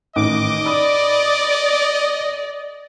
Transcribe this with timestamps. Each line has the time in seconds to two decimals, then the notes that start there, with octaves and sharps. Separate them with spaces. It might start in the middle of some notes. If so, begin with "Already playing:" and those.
0.16 A1 D#3 D#5 D6
0.66 D5 B5 D#6